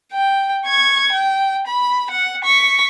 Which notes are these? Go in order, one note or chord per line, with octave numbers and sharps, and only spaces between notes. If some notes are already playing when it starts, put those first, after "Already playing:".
G5
C#6 G#6
G5
B5
F#5
C#6 B6